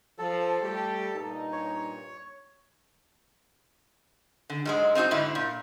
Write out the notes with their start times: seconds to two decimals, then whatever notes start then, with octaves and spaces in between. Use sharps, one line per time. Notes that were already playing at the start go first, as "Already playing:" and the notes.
0.18 F3 A4
0.60 G3 A3 G4
1.13 G2 A#2 D#4
1.53 C#5
4.50 D3
4.65 G#2 F#3 G#3
4.95 C4 D#4 F4 F#4
5.11 G#2 D3 E4
5.35 A#2